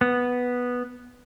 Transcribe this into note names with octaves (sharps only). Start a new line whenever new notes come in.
B3